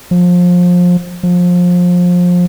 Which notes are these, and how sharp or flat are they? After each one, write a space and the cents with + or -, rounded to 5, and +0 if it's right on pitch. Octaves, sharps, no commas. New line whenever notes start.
F3 +25
F3 +25